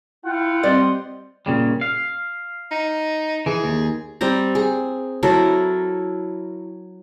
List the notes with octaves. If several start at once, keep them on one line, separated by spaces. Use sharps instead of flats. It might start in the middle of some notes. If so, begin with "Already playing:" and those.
E4 F4 F#5 G5
G3 C4 D5 D#5 C6
A#2 C#3 G3
F5
D#4
E3 G#4
D#2
G3 C4 A#5
G#4
F#3 E4 A4 A#4